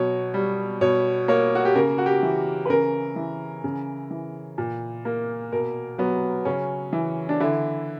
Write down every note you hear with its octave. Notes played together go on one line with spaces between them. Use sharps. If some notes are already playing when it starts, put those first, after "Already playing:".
Already playing: B2 F#3 C#5
G3
B2 C#5
A#3 C#5
F#4
G4
C#3 A#4
F#4
G4
E3
B4
C#3 A#4
E3
C#3
E3
A#2
A#3
B2 A#4
F#3 B3
C#3 C#4
E3
D4
D3 E4